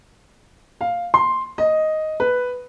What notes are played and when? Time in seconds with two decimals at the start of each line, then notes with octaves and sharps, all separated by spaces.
0.81 F5
1.14 C6
1.58 D#5
2.20 B4